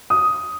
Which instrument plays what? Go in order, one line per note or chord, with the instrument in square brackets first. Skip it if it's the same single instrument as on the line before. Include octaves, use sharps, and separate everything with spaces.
[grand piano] D#6